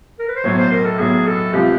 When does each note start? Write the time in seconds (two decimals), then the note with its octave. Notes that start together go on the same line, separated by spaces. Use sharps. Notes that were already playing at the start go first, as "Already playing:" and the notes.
0.19 A#4
0.28 B4
0.36 C5
0.44 B1 A2 F#3 C#5
0.58 C5
0.72 A#4
0.85 A4
0.99 B1 A2 F#3 G#4
1.26 A4
1.53 C#2 C3 F3 G4